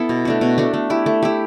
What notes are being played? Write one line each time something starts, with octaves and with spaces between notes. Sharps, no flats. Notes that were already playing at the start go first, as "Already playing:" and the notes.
Already playing: B3 E4 A4
B2
A3 D4 F#4
B2
A3 D4 F#4
A3
E4 G4
A3
E4 G4